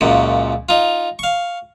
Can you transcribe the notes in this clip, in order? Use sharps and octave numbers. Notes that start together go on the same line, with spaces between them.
C#2 F#2 A#2
D#4 F4
F5 C#6